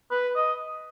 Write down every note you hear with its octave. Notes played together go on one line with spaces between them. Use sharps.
B4
D#5